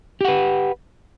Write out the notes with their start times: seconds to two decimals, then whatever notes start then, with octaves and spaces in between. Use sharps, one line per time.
0.21 G4
0.25 F#5
0.28 B4